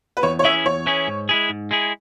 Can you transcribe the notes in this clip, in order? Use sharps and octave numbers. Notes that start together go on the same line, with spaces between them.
B4
E2 C#5
C#5
E3 C#4 E4 G#4 E5
E2 C#5
E3 C#4 E4 G#4
G#2
G#3 E4 G#4
G#2
G#3 E4 G#4